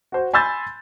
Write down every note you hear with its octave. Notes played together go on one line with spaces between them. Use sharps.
F#4 C5
G#5 B5 C6 E6 G6 A6